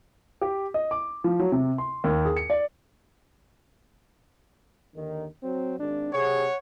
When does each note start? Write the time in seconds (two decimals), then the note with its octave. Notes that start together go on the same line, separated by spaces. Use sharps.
0.42 G4
0.74 D#5
0.91 D6
1.24 F3
1.40 F#3
1.52 C3
1.78 C6
2.04 D#2
2.25 G#4
2.37 C#7
2.50 D5
4.95 D#2 D3 D#3
5.43 F#3 C4
5.79 G#1 D4
6.14 C3 G#4 C#5 F#5